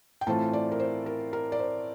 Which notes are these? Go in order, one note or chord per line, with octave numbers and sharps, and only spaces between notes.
G5
A2 E3 A3 C4 F4 A5
D5
A#4
C5
A#4
A#4
D5
C5